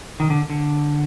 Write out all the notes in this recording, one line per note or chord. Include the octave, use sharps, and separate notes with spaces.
D#3
D3
D3